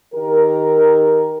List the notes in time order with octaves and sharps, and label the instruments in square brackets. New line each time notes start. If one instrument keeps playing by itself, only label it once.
[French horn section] D#3 G4 A#4